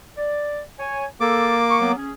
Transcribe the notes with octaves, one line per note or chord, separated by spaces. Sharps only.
D5
C#5 G#5
A#3 A4 D6
C#6
F#3 B3
C#4 G#4